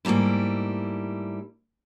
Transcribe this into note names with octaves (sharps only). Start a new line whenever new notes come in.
G#2 G3 A3 A#3 E4